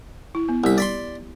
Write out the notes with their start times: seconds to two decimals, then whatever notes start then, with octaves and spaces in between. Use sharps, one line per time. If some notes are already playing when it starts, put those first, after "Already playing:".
0.35 E4
0.49 B3
0.64 C2 G4 B5
0.78 D5 B5 C6